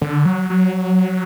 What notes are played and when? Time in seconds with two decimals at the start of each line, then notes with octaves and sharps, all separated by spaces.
0.02 D3
0.25 F#3
0.50 F#3